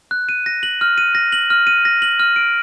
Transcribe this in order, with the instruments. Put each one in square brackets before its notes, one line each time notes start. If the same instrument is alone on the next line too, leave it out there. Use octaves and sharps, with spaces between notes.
[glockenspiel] F#6
D#7
A#6
F#7
F6
D#7
A#6
F#7
F6
D#7
A#6
F#7
F6
D7